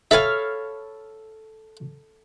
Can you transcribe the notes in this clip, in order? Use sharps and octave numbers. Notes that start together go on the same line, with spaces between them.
A4 C#5 E5 F5 G#5 B5 F6